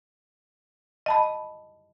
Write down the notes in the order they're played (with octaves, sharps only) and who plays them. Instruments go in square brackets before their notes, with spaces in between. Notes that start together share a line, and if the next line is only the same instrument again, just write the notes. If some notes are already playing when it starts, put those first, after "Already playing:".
[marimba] D#5 A5 B5